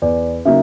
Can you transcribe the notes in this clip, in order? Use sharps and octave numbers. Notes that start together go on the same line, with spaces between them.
E2 D5
C#3 F#3 A#3 D#4 E5